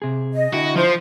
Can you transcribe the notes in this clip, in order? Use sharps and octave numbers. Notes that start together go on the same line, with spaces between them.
C3 G#4
D#5
D3 E4 F#4 G5
F3 C5